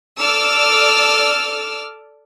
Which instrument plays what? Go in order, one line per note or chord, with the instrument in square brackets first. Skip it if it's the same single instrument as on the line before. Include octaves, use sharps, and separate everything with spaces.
[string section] A4 D5 D6 E6 F6